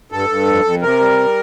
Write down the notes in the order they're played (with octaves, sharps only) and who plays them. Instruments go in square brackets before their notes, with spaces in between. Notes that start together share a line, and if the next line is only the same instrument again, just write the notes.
[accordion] G2 A4
G2
F2
F2
C3 A#4
G3